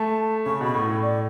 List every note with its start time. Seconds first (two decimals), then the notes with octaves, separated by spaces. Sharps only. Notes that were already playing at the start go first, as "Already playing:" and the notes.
Already playing: A3 A5
0.46 C#3 C#6
0.61 B2 B5
0.74 A2 C#6
0.89 A2
1.02 D5